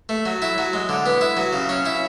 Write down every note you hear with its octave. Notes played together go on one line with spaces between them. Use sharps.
A3
F#3
E4
F#3
G#3
D3
B3
E4
F#3
C#3
C#4
E4